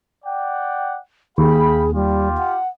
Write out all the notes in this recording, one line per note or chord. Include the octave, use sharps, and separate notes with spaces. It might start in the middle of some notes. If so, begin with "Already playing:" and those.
D5 F#5 G5
D#2 G#4 F5 G5 B5
G3 F4 G4
F#5